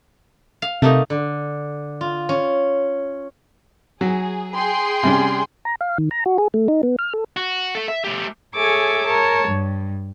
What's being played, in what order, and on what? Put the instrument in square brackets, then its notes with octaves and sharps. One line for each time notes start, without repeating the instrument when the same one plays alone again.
[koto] F5
[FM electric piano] C3 [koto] A3 A#3 D#4
[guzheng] D3
F4
C#4
[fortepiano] F#3 [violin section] G#4
[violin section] G#4 G5 C6
[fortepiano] C3 G3 C#4
[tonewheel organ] A#5
F5
D#3
A#5
F#4
G#4
A3
D#4
B3
F6
A4
[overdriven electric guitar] F#4
A3 A4
E5
A3 G4
[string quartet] G#4 A4 C#5 E5 G#5 D6
A#4 C#5 A5
G2